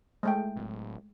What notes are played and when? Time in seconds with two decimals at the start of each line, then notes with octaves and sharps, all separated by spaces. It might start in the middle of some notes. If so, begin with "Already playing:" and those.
0.23 G#3 A3 G5
0.56 D1